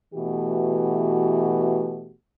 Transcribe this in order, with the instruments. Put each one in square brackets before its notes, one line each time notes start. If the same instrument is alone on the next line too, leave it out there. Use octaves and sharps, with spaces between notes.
[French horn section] B2 E3 A3 F#4 G4